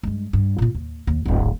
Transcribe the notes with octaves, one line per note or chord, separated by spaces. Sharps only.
G2 G#3
G2
A#2 F4
D#2
D#2
D1 G#1